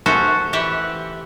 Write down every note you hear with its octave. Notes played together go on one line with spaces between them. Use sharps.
A3 C#4 F#4 C5
E3 G4 E5 F#5